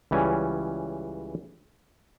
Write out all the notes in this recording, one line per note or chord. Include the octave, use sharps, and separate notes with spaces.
C#2 E3 G3 C#4 G#5